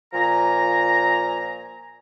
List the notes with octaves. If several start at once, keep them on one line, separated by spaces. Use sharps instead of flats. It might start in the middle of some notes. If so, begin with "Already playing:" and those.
A#2 F3 G#5 A#5